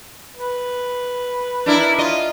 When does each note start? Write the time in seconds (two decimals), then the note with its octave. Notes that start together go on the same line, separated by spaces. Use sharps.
0.37 B4
1.66 D4 E4 A#4
1.98 F4 D#5